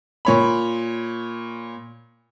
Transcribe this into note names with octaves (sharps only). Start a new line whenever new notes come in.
A#2 C#5 B5